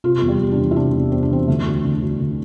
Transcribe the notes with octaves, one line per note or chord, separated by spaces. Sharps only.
C3 F4
E2
G3
E2
D4
E3
E4
C3 D4
E2
E2 C4
D4
E3 C4
D3 A3
D2
D3
D2
D3